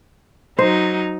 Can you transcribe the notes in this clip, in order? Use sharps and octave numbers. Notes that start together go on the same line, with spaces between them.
F#3 D#4 C5